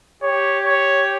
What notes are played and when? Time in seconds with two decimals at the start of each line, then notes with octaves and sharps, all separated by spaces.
0.22 G4 C#5
0.65 C#5